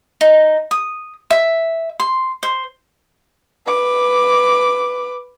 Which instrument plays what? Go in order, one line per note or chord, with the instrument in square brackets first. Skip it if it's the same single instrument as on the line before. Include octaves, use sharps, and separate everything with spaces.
[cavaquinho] D#4
D#6
E5
C6
C5
[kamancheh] B4 D6